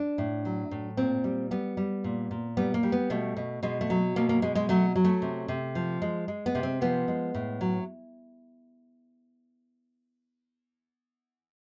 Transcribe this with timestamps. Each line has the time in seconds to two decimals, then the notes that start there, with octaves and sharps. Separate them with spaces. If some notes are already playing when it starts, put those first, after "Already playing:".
Already playing: D4
0.18 A2
0.45 F#3
0.71 A2
0.97 A#2 C4
1.24 G3
1.51 G3 B3
1.77 G3
2.04 A#2
2.31 A#2
2.57 G3 B3
2.74 A#3
2.83 G3
2.92 B3
3.10 B2 A3
3.37 B2
3.63 B2 G#3
3.81 A3
3.90 F#3
4.16 B2 A#3
4.29 A#3
4.42 B2 G#3
4.55 G#3
4.69 F#3 A3
4.96 F#3
5.04 A3
5.22 C3
5.48 C3
5.75 F3
6.02 G#3
6.28 G#3
6.46 B3
6.55 C3
6.63 C4
6.81 F3 B3
7.08 G#3
7.34 A2
7.61 F#3